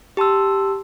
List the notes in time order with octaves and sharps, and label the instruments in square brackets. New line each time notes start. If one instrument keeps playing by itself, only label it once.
[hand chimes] G4 A5 C6 E6